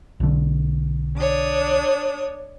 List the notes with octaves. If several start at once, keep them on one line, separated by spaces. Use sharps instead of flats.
B1 D3
D4 C#5 D#6